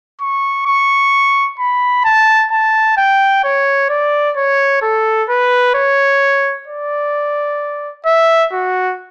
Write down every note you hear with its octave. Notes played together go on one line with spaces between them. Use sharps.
C#6
C#6
B5
A5
A5
G5
C#5
D5
C#5
A4
B4
C#5
D5
E5
F#4